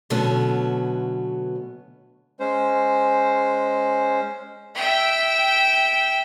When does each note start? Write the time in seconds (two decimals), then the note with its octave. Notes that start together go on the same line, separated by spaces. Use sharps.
0.10 B2 D3 F#3 A3 B3 C#4
2.40 G#3 C#4 C5
4.75 E5 G5